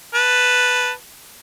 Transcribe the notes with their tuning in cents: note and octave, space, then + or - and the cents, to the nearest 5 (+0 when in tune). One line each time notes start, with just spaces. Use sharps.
B4 +0 A5 +0